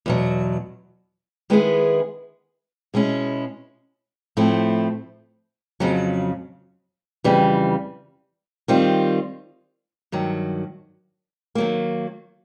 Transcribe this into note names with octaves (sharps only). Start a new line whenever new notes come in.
E2 B2 F#3
D#3 G#3 B3 E4 G#4
B2 G#3 C#4 E4
A2 F3 A3 C4 E4
F2 C#3 F#3
F2 C#3 E3 G3
D#3 G3 C4 F4
G2 D#3 F#3
D#3 F#3 A#3